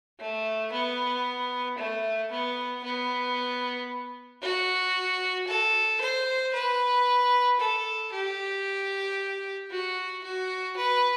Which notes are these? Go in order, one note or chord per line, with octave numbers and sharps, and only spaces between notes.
A3
B3
A3
B3
B3
F#4
A4
C5
B4
A4
G4
F#4
F#4
B4